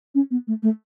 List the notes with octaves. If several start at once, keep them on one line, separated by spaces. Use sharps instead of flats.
C#4
B3
A3
A3